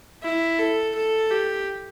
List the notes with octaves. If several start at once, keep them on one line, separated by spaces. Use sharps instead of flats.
E4
A4
A4
G4